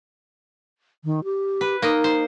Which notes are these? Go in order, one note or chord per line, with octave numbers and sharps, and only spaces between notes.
D#3
G4
B4
A#3 D#4 D#5
C5